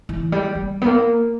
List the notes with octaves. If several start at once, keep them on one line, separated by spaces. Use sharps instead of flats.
E3
G3
G3
B3
A#3